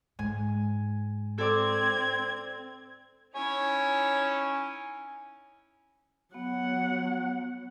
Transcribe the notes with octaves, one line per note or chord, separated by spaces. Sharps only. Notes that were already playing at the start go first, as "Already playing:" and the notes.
G#2 G#5
C4 A4 D5 D6 G#6
C#4 D#4 E4 C#5 G#5
F#3 B3 F#5